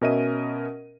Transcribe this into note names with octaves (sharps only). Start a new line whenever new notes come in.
B2 C#4 A#4 D#5 E5 D#7